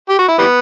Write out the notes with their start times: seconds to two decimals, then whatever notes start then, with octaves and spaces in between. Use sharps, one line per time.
0.09 G4
0.19 F#4
0.28 E4
0.38 E3 G3 B3